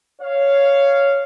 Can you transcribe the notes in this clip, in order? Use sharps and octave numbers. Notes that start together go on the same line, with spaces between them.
C#5 F5